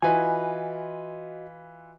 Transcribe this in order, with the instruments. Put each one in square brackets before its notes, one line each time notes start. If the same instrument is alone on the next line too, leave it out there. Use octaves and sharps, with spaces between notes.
[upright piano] E3 F4 B4 [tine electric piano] F#4 D#5 [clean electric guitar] G#5